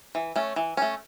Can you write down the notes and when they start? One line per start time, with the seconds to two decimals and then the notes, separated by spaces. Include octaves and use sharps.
0.15 E3
0.36 A3 C#4
0.56 E3
0.77 A3 C#4